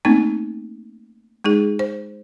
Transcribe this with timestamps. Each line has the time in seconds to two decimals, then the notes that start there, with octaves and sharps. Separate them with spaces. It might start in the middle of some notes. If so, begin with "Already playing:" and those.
0.05 A3 A#3 C4 C#4 D#4
1.44 G#3 D#4 G#4
1.79 C5